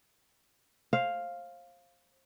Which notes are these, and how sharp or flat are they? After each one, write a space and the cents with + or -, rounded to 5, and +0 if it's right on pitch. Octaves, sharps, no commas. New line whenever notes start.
C5 +30 F5 +0